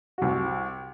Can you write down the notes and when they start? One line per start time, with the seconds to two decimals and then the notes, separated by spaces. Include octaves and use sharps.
0.18 C2 F#4